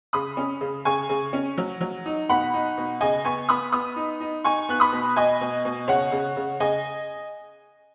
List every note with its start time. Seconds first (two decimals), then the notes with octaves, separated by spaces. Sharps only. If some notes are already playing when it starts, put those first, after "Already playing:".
0.13 C#3 B5 D#6
0.37 C#4
0.61 C#3
0.85 C#3 G#5 C#6
1.09 C#3
1.33 C#4
1.58 F#3
1.81 F#3
2.06 D#4
2.29 B2 F#5 B5
2.54 D#4
2.78 B2
3.01 C#3 D#5 G#5
3.25 B3 G#5 C#6
3.49 B3 B5 D#6
3.72 B3 B5 D#6
3.96 D#4
4.21 D#4
4.44 D#4 G#5 C#6
4.69 B3 F#6
4.80 B5 D#6
4.92 B2
5.16 B2 D#5 G#5
5.41 B2
5.65 B2
5.88 C#3 C#5 F#5
6.12 C#3
6.37 C#3
6.60 C#3 D#5 G#5